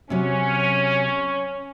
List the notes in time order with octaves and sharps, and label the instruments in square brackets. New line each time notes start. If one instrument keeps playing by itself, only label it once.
[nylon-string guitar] C3 F#3 [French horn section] C#4